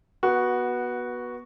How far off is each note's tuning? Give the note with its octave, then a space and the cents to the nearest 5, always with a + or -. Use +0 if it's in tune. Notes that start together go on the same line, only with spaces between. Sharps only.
B3 -20 F#4 +0